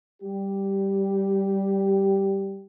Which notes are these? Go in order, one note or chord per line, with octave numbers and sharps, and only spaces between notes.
G3 G4